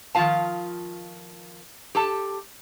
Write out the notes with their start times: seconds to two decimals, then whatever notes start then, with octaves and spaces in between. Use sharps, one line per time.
0.15 D#3 F3 F4 F5 A5
1.95 G4 A4 A5